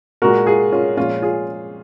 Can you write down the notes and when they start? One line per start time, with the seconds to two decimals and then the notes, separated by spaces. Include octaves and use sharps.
0.22 A#2 G#3 F#4 A#4
0.46 F4 G#4
0.72 C#4 F4
0.97 A#2 F3 G#3 C#4 F4
1.22 F4 G#4